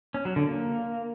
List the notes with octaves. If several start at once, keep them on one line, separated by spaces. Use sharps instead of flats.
C#4
F#3
D3
A#3